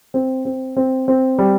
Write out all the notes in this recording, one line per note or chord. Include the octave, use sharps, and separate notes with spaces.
C4
C4
C4
C4
G3